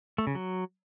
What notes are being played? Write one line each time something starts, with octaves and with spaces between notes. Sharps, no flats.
A3
C#3
F#3